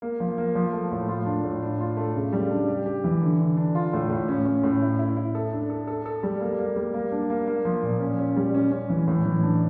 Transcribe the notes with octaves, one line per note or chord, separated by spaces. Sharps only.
A#3
F3
A#3
F3
A3
A2
F4
D4
A2
D4
F4
A3
C#3
G3
D4
G4
G4
E3
D3
D3
D4
F4
A2
A2
C#4
C#4
A2
E4
E4
E4
A4
D4
A4
A4
A4
G3
A#3
A#3
G3
A#3
D4
A#3
A#3
F3
A#2
C#4
C#4
G3
C#4
C#4
E3
A2
E3
D4